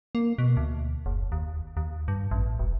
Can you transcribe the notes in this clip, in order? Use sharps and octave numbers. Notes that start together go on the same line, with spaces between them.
A#3
B2
D2
F#1
D#2
D#2
G2
A1
E1